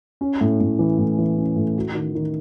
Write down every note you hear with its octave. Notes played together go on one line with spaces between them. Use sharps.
C#4
A2
A2
E3
A2
E3
C#4
A2
F#4
D#3
D#3